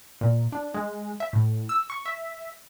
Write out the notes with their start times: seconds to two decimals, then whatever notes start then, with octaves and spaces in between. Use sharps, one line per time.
0.21 A#2
0.52 D4
0.74 G#3
1.20 E5
1.33 A2
1.69 E6
1.90 C#6
2.06 E5